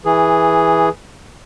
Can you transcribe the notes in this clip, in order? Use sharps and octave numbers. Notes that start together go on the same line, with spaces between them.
E3 G#4